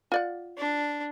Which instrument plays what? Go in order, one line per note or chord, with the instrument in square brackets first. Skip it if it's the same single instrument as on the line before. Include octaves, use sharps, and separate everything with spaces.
[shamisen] F4 D5 F#5
[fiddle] D4